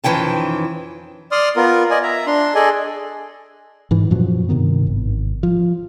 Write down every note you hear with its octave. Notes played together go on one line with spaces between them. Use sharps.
F2 D#3 E3 C#4 G5 A5
D5 C6 D#6 F6
B3 F4 A#4
D5 D#5 G#5
E5 A#5
D4 C6
G#4 A4 D5 D#5 G#5
G#2 E3
F#2 A#2 F3 F#3
G2 C3 D#3 B3
G#1
F3